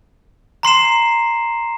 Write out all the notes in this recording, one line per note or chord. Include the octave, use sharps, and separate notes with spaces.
A#5 C6 C7 E7